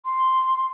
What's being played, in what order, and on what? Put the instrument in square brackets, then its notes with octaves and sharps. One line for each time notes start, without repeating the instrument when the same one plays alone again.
[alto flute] C6